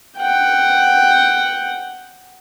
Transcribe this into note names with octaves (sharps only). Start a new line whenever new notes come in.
F#5 G5